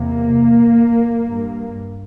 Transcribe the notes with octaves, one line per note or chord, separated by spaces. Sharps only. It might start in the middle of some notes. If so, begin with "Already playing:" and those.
Already playing: E2 C3 A#3
G2